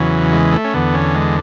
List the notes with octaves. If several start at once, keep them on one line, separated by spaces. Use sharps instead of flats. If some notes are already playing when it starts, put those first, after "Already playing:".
Already playing: E2 C#3 E3 F#3
G#3
A3
C#4
E2 D3 B3
C#4
G#3